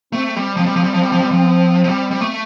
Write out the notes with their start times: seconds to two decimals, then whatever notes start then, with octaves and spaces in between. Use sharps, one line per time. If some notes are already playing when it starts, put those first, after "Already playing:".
0.13 A3 C4
0.35 G3 C4
0.57 F3 C4
0.66 G3
0.76 F3
0.84 G3
0.94 F3
1.03 G3
1.12 F3
1.21 G3
1.31 F3
1.84 F3
1.89 G3
2.11 G3
2.21 A3